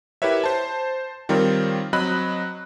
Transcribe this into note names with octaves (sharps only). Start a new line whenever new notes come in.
E4 G4 A#4 B4 C#5 E5
C5 A5
D#3 G3 C4 F4 A#4 C#5
F#3 C4 D#5 B5 F#6